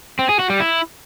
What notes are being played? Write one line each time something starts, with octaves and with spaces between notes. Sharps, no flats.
C4
G#4
F#4
G3
E4